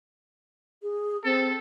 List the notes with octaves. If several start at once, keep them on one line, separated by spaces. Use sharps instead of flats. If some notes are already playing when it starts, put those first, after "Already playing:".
G#4
C4 A4